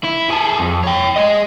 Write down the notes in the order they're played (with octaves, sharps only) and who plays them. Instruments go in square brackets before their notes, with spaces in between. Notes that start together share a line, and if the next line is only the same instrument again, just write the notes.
[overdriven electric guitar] E4
G#4 A4
F2
C#5 G5
G#4 D#5